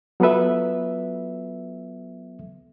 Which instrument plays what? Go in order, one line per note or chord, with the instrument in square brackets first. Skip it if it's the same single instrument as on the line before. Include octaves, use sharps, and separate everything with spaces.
[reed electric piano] F#3 B3 F4 A4 B4 E5